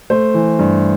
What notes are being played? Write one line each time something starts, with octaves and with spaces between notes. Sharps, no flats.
A3 C5
E3
G2